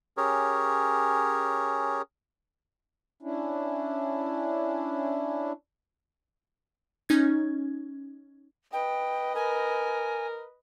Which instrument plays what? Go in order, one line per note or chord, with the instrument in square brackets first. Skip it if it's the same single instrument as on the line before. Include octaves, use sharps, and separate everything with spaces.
[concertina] C#4 G4 G#4 A#4 C#5
[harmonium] C#4 D4 E4
[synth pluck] C#4 D#4 G#6
[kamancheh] B4 D#5 [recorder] G5
[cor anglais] A#4 [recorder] G#5